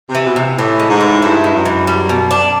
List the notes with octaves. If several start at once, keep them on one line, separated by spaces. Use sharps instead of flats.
C3
E3
B2
C3
A2 E3
G#3
G#2
E3
G2 E4
G#3
F#2
E3
G3
B2
D4